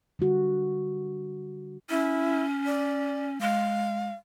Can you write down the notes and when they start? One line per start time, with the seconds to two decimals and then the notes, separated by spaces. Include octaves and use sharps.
0.19 D3 G3 F#4
1.90 C#4 E4
2.66 D5
3.41 G#3 F5